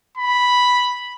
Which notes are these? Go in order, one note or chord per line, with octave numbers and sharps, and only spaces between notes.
B5